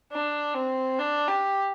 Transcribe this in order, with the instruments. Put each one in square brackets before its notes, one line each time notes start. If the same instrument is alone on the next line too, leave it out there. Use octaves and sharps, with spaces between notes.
[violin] D4
C4
D4
G4